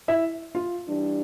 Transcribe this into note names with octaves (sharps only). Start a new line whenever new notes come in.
E4 E5
F4 F5
G2 E3 G3 D4